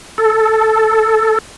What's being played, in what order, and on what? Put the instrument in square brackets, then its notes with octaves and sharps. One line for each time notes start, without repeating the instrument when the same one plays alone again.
[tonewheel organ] A4